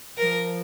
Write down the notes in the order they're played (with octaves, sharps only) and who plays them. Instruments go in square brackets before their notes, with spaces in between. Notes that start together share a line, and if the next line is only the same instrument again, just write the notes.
[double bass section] F3 [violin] A#4